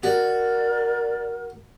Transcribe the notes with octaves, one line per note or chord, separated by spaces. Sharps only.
F#4 A#4 D5